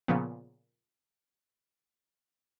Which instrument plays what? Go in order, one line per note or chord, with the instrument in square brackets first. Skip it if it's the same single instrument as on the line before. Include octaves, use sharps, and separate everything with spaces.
[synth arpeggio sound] A#2 C#3 F3 B3